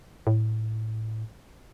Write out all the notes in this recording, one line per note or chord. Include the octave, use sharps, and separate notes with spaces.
A2